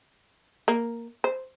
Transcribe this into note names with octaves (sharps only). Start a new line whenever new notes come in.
A#3
C5